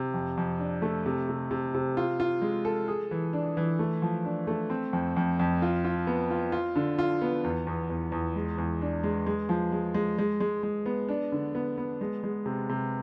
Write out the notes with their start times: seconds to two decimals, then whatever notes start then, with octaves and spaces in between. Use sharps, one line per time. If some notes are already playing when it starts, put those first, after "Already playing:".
Already playing: C3
0.14 F2
0.37 F2
0.59 D4
0.82 A3
1.06 C3
1.29 C3
1.51 C3
1.74 C3
1.97 F4
2.20 F4
2.42 G#3
2.65 A4
2.88 G#4
3.11 E3
3.33 D4
3.57 E3
3.79 A3
4.02 F3
4.25 D4
4.47 A3
4.70 C4
4.93 F2
5.16 F2
5.39 F2
5.62 F4
5.84 F4
6.07 B3
6.30 F4
6.52 F4
6.76 D3
6.98 F4
7.22 B3
7.44 E2
7.67 E2
7.90 E2
8.12 E2
8.36 G#3
8.58 E2
8.82 D4
9.03 G#3
9.26 G#3
9.49 F3
9.72 G#3
9.94 G#3
10.18 G#3
10.40 G#3
10.63 G#3
10.86 B3
11.09 D4
11.32 D3
11.55 B3
11.78 B3
12.01 G#3
12.24 G#3
12.46 C3
12.69 C3